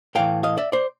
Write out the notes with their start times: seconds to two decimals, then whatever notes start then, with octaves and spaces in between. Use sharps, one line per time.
0.15 A2 E3 F5 G5
0.43 D#5 F5
0.58 D5 E5
0.72 C5 D5